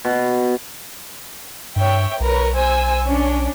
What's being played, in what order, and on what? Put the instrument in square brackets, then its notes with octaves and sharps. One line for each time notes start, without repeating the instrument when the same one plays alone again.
[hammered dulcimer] B2
[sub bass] G2 [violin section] C#5 E5 G5
[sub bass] B1 [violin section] A#4 B4 C#5
[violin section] C5 G#5 E6
C#4 D4